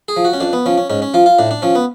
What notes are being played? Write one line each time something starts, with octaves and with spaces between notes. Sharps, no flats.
G#4
F3
F#4
C#4
F2 D4
B3
F3 C#4
C#4
G#2 C#4
C#4
F3 F4
F4
A2 D4
D4
F3 C#4
B3